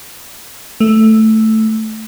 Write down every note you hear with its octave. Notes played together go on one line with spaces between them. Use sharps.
A3